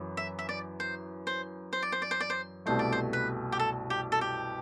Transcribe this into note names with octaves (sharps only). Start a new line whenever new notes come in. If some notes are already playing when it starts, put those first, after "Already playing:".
Already playing: F#2 E3
E5
E5
D5
C5
C5
C5
D5
C5
D5
C5
D5
C5
C2 B2 A3 C5
D5
C5
B4
G4
A4
G4
A4
G4